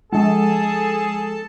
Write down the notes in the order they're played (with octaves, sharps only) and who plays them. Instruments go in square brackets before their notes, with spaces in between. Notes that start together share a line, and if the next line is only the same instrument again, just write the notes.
[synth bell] F3 G#3 [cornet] G#4 [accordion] A4 A5